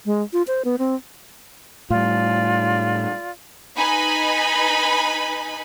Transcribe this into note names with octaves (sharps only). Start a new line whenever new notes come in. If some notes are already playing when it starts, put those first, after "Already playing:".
G#3
F4
C5
B3
C4
A2 G3 F4 D5
D#4 B4 G#5 B5